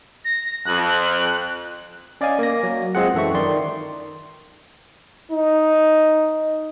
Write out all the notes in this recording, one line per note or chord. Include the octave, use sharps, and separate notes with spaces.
A#6
F2 F#6
C#4 D5 D#5 F5 G#5
A#3 A#6
F#3
G#3 C4 F4 G#4 F#5
F#2 E3 A4 E5 C#6
D#3 D5 C6
D#4